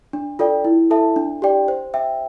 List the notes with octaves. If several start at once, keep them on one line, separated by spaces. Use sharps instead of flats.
D4
F4 A4 D5 G5
E4
A4 E5 A5
D4
G4 D5 G5
C5
E5 G5